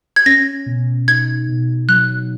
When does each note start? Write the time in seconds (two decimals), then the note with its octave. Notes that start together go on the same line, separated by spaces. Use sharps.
0.16 G#6
0.26 C#4 A#6
0.66 B2
1.08 D#4 G#6
1.48 B2
1.88 F#3 F#6